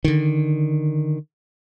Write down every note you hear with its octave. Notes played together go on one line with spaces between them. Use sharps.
D3 D#3